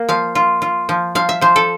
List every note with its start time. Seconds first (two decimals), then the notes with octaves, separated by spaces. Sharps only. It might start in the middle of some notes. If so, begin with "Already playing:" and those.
Already playing: A#3
0.09 F3 F5
0.35 F4
0.62 F4
0.89 F3
1.15 F3 F5
1.29 E5
1.41 F3 C5
1.56 A4